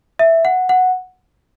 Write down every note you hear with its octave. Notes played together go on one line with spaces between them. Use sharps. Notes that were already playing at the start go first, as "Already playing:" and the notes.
E5
F#5
F#5